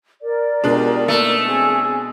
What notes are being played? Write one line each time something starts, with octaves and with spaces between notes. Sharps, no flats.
A#4 D5
B2 G#3 D4 F4 G4
A3 A#3 D#4
C4 G#4